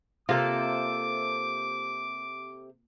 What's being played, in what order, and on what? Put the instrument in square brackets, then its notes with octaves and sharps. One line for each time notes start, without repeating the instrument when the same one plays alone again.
[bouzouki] C3 A4 C5 [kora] A#3 F4 [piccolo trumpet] D6